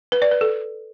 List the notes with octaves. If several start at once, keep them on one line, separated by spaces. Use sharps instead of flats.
B4
D5
B4
A4